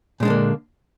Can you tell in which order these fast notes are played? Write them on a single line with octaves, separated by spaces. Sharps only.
A#2 G#3 D4 D3 A#3